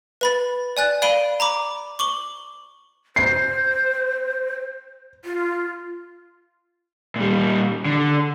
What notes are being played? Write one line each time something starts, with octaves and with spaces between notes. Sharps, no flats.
B4 B5 A6
D5 G#5 F#6 A6
D5 F5 B5 D7 D#7 G7
A#5 B5 D6
C#6 D6 F#7 G7
C5 C7
F4
A#2 G3
D3